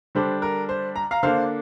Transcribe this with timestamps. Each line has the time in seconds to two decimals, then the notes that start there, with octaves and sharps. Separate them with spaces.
0.15 D3 G3 D4 C5
0.42 A#4
0.69 C5
0.96 A#5
1.11 F5 A#5
1.23 D3 A#3 D4 C5 F5